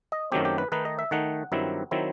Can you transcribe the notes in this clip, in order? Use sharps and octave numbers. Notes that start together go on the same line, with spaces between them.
D#5
F#2 D#3 F#3 A3 C4 G4
G4
B4
D#3 A3 D#4 B4
D#5
E5
D#3 A3 D#4 F#5
G2 D#3 F#3 C4 E4
D#3 F#3 C4 E4